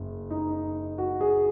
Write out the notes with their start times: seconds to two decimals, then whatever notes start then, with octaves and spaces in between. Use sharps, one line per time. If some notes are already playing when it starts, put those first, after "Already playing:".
Already playing: F#1
0.30 D#4
0.98 F#4
1.21 G#4